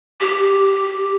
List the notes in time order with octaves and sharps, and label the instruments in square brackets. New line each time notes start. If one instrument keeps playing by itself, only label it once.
[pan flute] G4